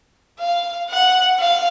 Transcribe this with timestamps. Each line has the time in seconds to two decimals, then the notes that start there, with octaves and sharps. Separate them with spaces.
0.39 F5
0.89 F#5
1.39 F5